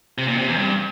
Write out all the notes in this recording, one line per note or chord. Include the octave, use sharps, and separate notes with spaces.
C3
A#2
C3
E2
G2